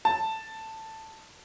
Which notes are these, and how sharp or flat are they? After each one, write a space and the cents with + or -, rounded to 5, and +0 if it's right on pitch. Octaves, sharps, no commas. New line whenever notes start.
A5 +5